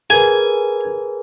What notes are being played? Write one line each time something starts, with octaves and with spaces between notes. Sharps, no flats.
G#4 A#4 B4 G#5